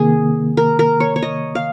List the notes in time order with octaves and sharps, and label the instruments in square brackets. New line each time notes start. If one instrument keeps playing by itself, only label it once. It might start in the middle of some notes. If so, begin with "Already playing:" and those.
Already playing: [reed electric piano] C3 D#3 A#3 [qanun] G#4
[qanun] A#4
A#4
C#5
C#5
D#5
F5